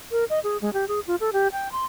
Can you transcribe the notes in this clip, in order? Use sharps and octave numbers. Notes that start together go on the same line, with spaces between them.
A#4
D#5
G#4
G#3
G4
G#4
F4
A4
G4
G5
C6